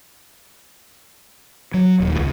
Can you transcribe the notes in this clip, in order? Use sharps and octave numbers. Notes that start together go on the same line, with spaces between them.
F#3
D#1
C#2